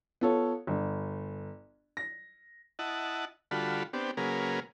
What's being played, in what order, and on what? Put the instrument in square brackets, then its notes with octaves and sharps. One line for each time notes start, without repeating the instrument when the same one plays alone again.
[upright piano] B3 F4 A4 C#5
G1
A#6
[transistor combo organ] E4 D#5 F#5 A5
D3 G3 F4 F#4 A4 B5
B3 C4 D4 G4
C#3 F#3 A#3 G#4 A#4 B4